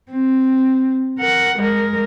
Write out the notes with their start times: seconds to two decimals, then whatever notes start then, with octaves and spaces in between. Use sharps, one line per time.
0.12 C4
1.18 A#4 F#5
1.58 G#3 A#4